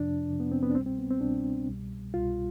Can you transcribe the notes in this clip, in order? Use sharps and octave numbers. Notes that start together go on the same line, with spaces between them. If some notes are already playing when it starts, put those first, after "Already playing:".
Already playing: F2 C3 F3 D4
F2 C3 F3
B3
C4
B3
D4
C2 B2 G3 C4
C4
B3
C4
C2 B2 G3 D4
C2 B2 G3
C2 B2 G3 F4